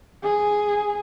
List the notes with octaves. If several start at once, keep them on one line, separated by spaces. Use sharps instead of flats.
G#4